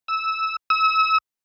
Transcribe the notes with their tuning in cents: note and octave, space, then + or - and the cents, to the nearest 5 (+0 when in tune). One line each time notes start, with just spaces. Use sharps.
E6 -15
E6 -35